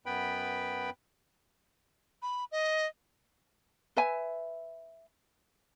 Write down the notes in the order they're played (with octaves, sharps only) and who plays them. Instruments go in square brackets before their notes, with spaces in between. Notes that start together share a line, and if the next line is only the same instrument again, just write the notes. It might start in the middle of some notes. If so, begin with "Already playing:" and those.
[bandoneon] F#2 B3 B4 G5 B5
[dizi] B5
D#5
[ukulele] B4 E5 G#5